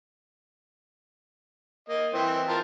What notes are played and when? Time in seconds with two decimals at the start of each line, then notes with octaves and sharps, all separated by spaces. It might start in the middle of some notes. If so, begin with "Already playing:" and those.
1.89 A#3 D#5
2.14 E3 C4 C5
2.48 F4 A#4 A5